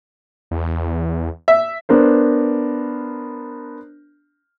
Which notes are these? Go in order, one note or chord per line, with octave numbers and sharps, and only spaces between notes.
E2
E5
B3 D4 A#4 C5